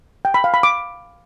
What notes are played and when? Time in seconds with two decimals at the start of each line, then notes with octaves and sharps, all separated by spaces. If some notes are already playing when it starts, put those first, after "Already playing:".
0.25 G5
0.34 B5
0.44 F5
0.54 B5
0.63 D6